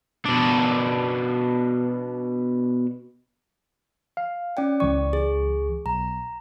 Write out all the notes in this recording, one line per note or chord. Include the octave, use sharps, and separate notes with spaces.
B2 D4
F5
C#4 D5 G5
C#2 E3 D5 C#6
G#4
B1 A#5